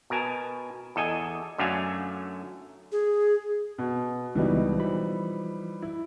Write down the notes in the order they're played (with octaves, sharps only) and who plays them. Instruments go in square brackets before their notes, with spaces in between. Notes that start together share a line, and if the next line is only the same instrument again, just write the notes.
[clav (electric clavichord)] B2 A#4 G#5 A5
E2 A4 D#5 G#5
F#2 D3 F#3 A3 F5 G#5
[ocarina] G#4
[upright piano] B2
[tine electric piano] C#2 B2 [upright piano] E3 G3 D#4
[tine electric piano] F3 B5
[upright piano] E4